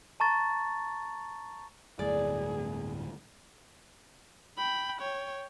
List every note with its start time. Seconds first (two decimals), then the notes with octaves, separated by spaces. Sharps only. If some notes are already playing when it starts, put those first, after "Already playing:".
0.20 A5 A#5 C#6 A6
1.99 D1 G1 A2 G#4 D5
4.58 G5 B5
5.00 C#5 G5